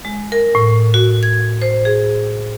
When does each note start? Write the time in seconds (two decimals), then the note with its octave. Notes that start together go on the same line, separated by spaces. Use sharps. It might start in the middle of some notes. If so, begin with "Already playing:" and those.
0.05 G#3
0.32 A#4
0.55 A2
0.94 F#4
1.23 G#6
1.62 C5
1.85 G#4